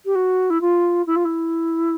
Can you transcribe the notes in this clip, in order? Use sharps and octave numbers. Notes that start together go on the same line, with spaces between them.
G4
F#4
E4
F4
E4
F4
E4